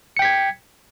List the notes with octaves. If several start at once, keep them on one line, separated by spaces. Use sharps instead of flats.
G5 G#6 B6 C#7